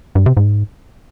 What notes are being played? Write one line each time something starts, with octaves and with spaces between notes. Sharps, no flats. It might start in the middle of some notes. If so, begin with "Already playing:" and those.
G2
C3
G#2